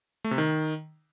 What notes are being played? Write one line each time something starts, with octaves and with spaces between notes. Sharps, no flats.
A3
C3
D#3